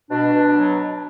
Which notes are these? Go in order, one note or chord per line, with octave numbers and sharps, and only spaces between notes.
B2 D4
B2
F#3